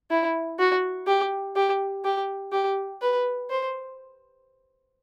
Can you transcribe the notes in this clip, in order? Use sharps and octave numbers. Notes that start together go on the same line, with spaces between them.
E4
F#4
G4
G4
G4
G4
B4
C5